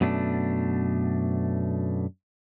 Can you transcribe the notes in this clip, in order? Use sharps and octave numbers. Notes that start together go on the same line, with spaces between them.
F#2 B2 A3 D4